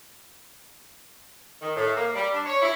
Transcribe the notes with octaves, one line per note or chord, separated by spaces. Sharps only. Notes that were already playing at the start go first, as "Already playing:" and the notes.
D#3
A2
A#3
G3
D4
C#5
E4